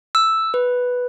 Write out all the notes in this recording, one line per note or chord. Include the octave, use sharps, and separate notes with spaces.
E6
B4